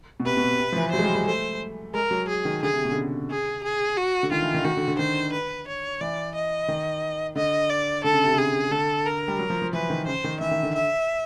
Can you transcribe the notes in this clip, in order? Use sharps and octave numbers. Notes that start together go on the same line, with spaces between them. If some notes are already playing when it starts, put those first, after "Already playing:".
B2
C3 B4
B2
C3
C3
F3
E3
F#3 C5
G#3
G3
G#3
A3 C5
G#3 A#4
F#3
G#4
D#3
D3 G#4
C3
B2
D3
C#3
G#4
G#4
F#4
D3
D#3 F4
E3
D#3
D#3 F#4
D3
D3
D#3 C5
B4
C#5
E3 D5
D#5
D#3
D3 D#5
D5
D3 A4
C#3
C3
C#3 G#4
D3 A4
A#4
G3
F#3
F3
F3
E3 B4
D#3
C#3 C5
D#3
E3 E5
D#3
D3
E5